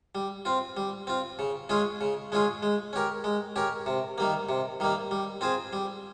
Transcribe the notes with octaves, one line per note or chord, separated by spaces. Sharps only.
G3
C4 F4
G3
C4 F4
C#3
G#3 C#4 F4 G#4
C#3
G#3 C#4 F4 G#4
G#3
C#4 G4 A#4
G#3
C#4 G4 A#4
C3
D#3 G3 A#3
C3
D#3 G3 A#3
G3
C4 F4 G#4 C5
G3